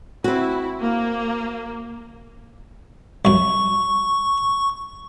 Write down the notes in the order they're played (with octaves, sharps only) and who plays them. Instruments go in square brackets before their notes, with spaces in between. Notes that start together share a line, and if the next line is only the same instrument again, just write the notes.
[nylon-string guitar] C4 F#4 [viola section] E4
[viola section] A#3
[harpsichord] C2 F#2 [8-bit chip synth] C#6